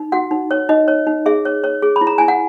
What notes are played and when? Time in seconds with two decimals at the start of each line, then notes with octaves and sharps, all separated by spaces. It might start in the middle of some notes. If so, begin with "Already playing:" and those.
Already playing: D#4
0.12 F#4 F#5
0.31 D#4
0.51 C#5
0.69 D#4 D#5
0.88 C#5
1.07 D#4
1.26 G#4 E5
1.45 C#5
1.64 C#5
1.82 G#4
1.96 B5
2.01 E4
2.07 A#5
2.18 E4 G#5
2.28 F#5